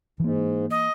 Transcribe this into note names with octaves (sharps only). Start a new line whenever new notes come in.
G#2 E3 A#3
D#5